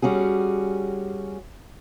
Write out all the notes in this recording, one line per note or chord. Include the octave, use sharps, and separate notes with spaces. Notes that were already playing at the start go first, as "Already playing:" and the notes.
G3 C#4 F#4 G#4